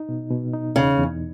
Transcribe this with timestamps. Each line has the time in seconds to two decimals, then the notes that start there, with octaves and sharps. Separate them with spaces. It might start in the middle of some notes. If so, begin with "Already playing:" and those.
Already playing: D#4
0.09 B2
0.31 B2
0.54 D#4
0.75 E2 C#3
0.98 E2